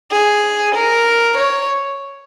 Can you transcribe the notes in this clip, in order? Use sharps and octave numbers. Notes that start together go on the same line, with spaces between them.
G#4
A#4
C#5